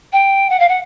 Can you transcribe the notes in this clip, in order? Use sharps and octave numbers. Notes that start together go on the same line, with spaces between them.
G5
F#5
F5
F#5